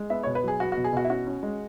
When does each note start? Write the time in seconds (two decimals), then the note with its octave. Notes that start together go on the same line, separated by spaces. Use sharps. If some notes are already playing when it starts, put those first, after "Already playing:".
Already playing: G#3
0.10 B3 E5
0.23 B2 C#5
0.35 B4
0.44 F#3 G#4
0.60 B3 F#4
0.72 B2 F#4
0.84 G#4
0.93 B2 F#4
1.04 E4
1.10 C#4 F#4
1.27 C#4
1.43 G#3